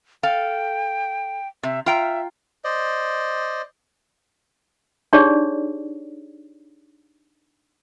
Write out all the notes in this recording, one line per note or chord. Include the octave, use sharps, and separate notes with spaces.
A4 F5 G5
C3 E5
F4 E5 G5 A#5
C5 D5 D#5
D4 D#4 G4 G#4 C#5 D5